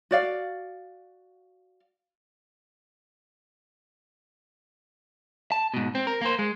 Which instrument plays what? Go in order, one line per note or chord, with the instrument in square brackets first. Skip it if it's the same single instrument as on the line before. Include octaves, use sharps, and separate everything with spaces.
[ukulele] F#4 D5 F5
[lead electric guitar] A5
G#2 B2
C4
A#4
A#3 C5
G#3